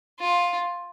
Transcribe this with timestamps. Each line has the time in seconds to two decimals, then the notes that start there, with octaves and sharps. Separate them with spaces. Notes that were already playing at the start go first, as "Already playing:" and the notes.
0.20 F4